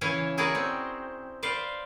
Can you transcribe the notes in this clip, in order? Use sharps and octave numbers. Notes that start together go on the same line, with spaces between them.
C#3 E3 E4 C#5 F5 G#5
E4 F#4 G#4 A#4 C#5 D5
C4
B4 C5 D5 F5